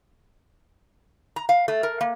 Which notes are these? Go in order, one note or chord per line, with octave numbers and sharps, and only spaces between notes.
A#5
F5
A3
A#4
A#3